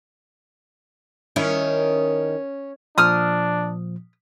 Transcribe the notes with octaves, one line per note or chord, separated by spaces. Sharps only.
D#3 C#4 E4
A#2 F3 D4 D#6 F6